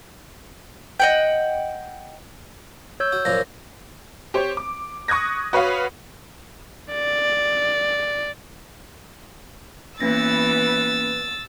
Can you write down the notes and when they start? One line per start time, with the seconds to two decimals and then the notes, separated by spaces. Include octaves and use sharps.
1.00 D#5 F#5 G5
3.00 C#5 E6 G6
3.12 F#4
3.25 F#2 A#2 F3 A#6
4.34 G4 C5 C#5
4.57 D6
5.08 C#6 D#6 F#6 G#6 A#6
5.53 F#4 B4 C#5 F5 F#5
6.92 D5
10.00 E3 A#3 B3 C#4 B4 E6 A6 A#6